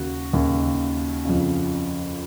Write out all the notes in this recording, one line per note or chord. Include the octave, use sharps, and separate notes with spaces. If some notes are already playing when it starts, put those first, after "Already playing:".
Already playing: D#2 C#3 F#4
D#2 C#3
F2 C#3